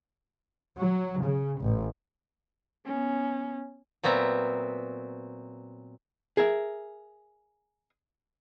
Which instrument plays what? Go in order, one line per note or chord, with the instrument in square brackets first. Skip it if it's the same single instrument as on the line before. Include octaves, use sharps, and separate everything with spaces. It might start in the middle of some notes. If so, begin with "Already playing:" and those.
[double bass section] F#3
C#3
A1
[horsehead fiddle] B3 C#4
[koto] A#2 F#3 B3 C4 E5 A#5
[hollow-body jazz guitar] G#4 A#4 E5